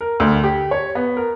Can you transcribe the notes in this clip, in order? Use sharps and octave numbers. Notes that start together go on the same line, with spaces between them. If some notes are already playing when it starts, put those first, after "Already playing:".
A#4
D2
G4
C#5
B3
A#4